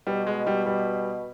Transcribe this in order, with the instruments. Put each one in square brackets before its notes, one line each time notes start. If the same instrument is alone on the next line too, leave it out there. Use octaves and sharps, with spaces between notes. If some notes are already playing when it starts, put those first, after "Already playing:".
[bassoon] B2 [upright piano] G3
[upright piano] G#3
G3
G3